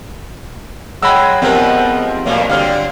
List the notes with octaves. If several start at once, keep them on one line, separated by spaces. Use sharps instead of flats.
F#3 G#3 G5 B5 E6
G#2 F3 G3 B3 C4 A#4
F2 A#2 F#3 A#3
D3 F#3 G3 C4 F5 F6